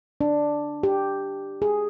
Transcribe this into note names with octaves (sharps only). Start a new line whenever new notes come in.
D4
G4
G#4